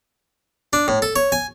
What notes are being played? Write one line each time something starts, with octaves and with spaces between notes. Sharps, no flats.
D4
A2
A4
C#5
G#5